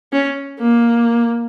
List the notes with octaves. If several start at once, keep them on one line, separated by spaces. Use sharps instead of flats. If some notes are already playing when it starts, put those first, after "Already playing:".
C#4
A#3